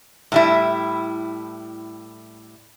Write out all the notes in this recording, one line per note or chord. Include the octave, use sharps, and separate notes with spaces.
A2 G3 E4